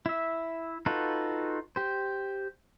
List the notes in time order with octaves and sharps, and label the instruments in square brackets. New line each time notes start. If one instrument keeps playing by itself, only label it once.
[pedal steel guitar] E4 E5
D#4 F4 F#4 A4 B4
G4 C5